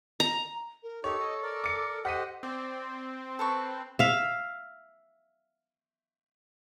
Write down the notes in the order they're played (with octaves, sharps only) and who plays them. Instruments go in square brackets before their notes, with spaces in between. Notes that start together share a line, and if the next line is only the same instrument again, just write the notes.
[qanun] A#5
[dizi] A#4
[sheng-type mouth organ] D#4 G4 [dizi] A4 [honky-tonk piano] C#5
[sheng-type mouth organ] D#5
A#4 D5
[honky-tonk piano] D6 C#7
[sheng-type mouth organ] G4 C5 D#5 [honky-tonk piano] F#5 B6 D#7
[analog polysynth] C4 [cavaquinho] D5
[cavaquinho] A4 B4 C#6
[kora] E5 F5